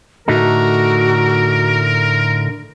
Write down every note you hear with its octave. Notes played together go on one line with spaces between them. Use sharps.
A2 D3 A3 D#4 F#4 A#4